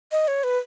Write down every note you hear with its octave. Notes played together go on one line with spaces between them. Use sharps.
D#5
C#5
B4